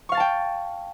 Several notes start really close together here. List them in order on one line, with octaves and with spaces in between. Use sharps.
C#6 F5 A6 A5 G5